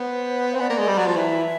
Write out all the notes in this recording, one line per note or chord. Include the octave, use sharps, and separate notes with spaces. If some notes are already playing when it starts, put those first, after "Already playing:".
Already playing: B3 C5
C4
B3 D5
A#3
G#3
G3
F#3
F3
E3 E5